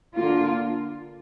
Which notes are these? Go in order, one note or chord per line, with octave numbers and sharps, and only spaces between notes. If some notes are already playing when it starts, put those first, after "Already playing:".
D3 A#3 F4